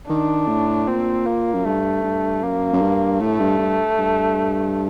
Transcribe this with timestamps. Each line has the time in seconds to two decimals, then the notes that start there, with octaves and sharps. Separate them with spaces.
0.09 D#3 D4
0.49 A2
0.87 A#2 C4
1.26 A#3
1.54 F#2
1.65 G2 A3
2.04 G2
2.43 F#2 A#3
2.73 F#2
2.81 G2
3.20 A2 A3
3.40 G2
3.59 G2
3.98 G2